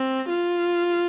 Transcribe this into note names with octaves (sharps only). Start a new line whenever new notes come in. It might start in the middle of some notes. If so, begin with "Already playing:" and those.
Already playing: C4
F4